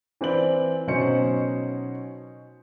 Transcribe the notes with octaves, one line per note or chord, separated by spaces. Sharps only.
E3 C4 B4 D5 F#7
B2 F#3 C#4 D#4 C5 C#7